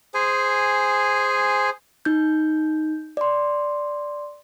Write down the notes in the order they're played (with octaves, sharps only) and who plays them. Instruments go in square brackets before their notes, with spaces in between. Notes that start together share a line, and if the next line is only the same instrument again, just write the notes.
[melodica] G#4 C5 G#5
[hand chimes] D#4 G6
D5 C6